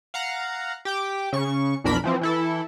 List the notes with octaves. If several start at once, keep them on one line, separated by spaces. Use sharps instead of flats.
F5 F#5 A#5
G4 G5 D6
C#3 C#6
B1 F2 D4 A#4 B5 B6
E3 F3 C4
E3 E4 A4